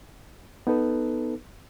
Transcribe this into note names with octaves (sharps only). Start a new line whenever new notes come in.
B3 D#4 A4 B4